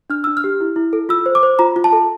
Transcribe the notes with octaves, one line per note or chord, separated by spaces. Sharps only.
D4 F6
D4 E6
F6
G4
E4
E4
A4
F4 E6
C5
D6
C5
F4 A#5
F4
A5
A4